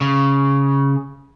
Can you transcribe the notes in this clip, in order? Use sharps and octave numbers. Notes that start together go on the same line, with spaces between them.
C#3